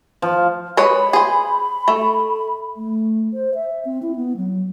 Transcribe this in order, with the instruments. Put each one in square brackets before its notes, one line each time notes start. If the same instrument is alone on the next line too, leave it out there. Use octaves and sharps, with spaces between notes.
[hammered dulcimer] F3
[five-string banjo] G#3 B4 C#5 [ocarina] B5
[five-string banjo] G#4 C5
A3
[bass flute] A3
C5
E5
C4
E4
B3
F#3